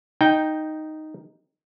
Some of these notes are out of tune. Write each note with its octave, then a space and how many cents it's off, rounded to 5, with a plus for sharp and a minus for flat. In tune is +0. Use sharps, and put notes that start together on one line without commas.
D#4 +0 G5 +0